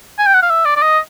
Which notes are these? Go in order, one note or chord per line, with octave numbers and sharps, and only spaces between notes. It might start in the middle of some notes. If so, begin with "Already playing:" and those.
G#5
G5
F#5
F5
E5
D5
D5
D#5